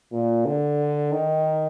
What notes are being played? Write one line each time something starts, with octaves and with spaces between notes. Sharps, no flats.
A#2
D3
D#3